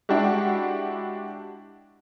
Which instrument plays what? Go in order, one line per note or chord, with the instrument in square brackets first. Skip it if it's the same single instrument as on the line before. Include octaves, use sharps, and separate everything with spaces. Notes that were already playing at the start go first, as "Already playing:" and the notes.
[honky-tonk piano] G#3 D4 E4 F#4 G4